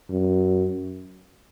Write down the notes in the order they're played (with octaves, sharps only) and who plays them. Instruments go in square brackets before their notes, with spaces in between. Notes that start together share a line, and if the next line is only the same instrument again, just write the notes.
[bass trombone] F#2